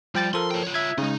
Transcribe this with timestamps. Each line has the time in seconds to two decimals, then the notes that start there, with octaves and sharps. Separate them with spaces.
0.15 F3 G3 G5 A6
0.33 F3 A4 A#4 C6
0.51 C#5 G5
0.63 F4 C#5
0.74 E5 G#6
0.98 C#3 G#3 D#4